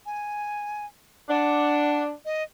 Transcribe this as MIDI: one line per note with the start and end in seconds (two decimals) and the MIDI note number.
0.06 0.86 80
1.29 2.11 62
1.29 2.03 78
2.25 2.43 75